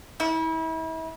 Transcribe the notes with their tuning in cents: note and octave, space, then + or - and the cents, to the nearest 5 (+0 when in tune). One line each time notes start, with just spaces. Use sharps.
E4 -35